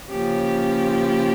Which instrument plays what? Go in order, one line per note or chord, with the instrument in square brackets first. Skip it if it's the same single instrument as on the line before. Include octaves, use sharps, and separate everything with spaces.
[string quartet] C#3 F3 A#3 C#4 G4